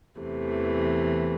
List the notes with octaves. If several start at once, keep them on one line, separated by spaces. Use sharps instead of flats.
E2 C3 E3 A3